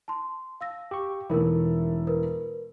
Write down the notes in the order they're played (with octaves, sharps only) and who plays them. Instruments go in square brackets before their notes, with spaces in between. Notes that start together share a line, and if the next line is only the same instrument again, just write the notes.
[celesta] A5 C6
F5 E6 A#6
[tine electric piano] G4 C#6
[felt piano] E1 A3 [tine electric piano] E3 E4 [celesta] D#4 A#4
[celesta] A#4 B4